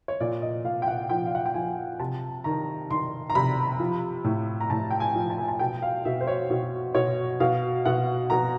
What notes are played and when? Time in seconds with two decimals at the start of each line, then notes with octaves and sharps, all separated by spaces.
0.08 C#5
0.20 A#2 D5
0.42 D#5
0.64 A#2 F5
0.82 G5
0.88 F#5
1.10 F3 G5
1.26 F5
1.35 F#5
1.46 G5
1.54 F3 G#5
2.00 C3 A5
2.44 D#3 A#5
2.91 D#3 C6
3.30 A#5
3.35 C3 B5
3.79 F3
4.24 A2
4.61 A#5
4.70 A2 A5
4.91 G5
5.00 G#5
5.15 F3
5.30 A5
5.38 G#5
5.48 A5
5.59 B2 G5
5.82 F5
6.05 B2 E5
6.21 C5
6.27 C#5
6.50 B2
6.95 B2 C#5
7.40 B2 F5
7.85 B2 F#5
8.30 B2 A#5